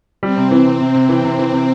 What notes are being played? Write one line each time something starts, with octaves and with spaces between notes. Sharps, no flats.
G3 C4
C3
E3
C3
C3
C3
E3
C3
E3
C3